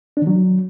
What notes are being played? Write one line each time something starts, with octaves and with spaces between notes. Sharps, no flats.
D4
D#3
F#3